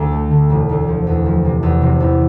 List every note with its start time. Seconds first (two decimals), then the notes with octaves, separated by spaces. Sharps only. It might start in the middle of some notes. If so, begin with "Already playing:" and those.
Already playing: D2 D3
0.12 A3
0.31 D3
0.50 E1
0.69 D2
0.88 F3
1.07 E2
1.26 F3
1.45 C3
1.63 E2
1.82 C3
2.00 E2